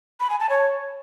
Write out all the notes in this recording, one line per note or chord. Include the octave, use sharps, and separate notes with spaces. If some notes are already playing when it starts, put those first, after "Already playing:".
B5
G#5
A5
C#5